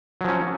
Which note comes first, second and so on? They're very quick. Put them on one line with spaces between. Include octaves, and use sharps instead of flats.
F#3 F3 C#4